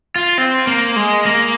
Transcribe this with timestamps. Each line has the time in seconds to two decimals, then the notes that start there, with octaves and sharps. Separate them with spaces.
0.16 F4
0.38 C4
0.67 A#3
0.96 G#3
1.26 A#3